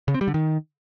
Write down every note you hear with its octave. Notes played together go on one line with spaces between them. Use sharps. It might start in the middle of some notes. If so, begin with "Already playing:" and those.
C#3
C4
G3
D3
D#3